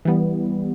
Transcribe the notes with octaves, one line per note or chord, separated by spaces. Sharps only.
E3 G3 B3